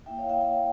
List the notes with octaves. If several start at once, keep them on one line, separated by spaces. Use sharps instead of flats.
A#3 E4 E5 G5
C#5 F5
E5 G5
E5 G5